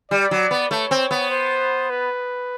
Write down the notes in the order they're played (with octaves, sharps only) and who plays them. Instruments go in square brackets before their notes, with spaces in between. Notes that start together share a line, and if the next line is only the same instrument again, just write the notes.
[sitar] G3 [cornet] D5
[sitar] F#3
B3
[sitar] A3 [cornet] C#5
[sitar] C4
B3
[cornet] C5
B4